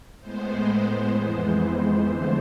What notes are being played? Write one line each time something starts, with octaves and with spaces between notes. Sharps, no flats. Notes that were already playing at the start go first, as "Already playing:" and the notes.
A2 G#3 B3 C5
C5
F2 E3 G#3 B3
F2 D3 F3 A3 C5